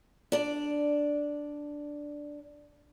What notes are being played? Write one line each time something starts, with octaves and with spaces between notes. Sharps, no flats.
D4 D5